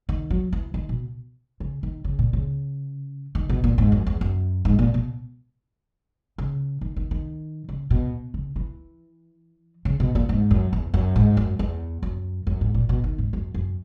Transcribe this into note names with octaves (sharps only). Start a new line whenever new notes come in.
D#3
F#3
E3
D#3
B2
C#3
D#3
C#3
A#2
C#3
D#3
B2
A#2
G#2
F#2
E2
F#2
G#2
A#2
B2
C#3
D#3
D#3
D#3
C#3
B2
C#3
E3
C#3
B2
A#2
G#2
F#2
E2
F#2
G#2
F#2
E2
F#2
F#2
G#2
A#2
B2
D#3
G#2
F#2
F#2